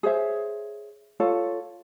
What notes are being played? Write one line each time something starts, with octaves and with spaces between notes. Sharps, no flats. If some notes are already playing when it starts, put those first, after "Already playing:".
G#4 C5 C#5 E5
F4 A4 C#5